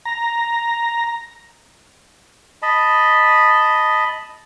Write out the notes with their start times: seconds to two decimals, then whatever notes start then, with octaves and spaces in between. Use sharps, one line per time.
0.05 A#5
2.62 D#5 A5 B5